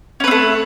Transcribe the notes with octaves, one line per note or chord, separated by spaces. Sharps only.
A3 C4 C#4 B4